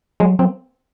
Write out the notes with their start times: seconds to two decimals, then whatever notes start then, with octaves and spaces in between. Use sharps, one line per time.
0.20 F#3 G#3
0.39 F#3 C4